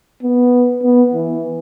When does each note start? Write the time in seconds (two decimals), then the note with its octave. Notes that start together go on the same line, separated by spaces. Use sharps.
0.23 B3
0.83 B3
1.13 E3